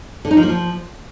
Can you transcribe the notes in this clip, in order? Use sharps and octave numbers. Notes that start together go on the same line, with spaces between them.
D3
D#4
F3
A#3
F3